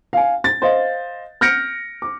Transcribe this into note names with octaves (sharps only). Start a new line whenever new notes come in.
F5 G#5
A6
C5 D#5 F5
F6 G6 A#6 C#7 D7
D6